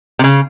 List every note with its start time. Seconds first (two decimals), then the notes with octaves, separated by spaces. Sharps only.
0.19 C3
0.24 C#3